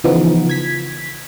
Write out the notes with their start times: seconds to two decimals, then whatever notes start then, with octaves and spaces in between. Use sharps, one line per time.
0.04 C#3 E3 F3 B3 D#4
0.49 G#6 B6